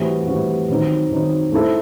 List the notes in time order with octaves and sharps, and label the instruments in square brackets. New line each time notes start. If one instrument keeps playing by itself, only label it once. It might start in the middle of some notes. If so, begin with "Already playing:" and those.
Already playing: [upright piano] A2 E3 G3 C4 F#4
A2 E3 G3 C4 F#4
D#3 F#3 C4 D#4
D#3 F#3 C4 D#4
A3 E4 A4 C5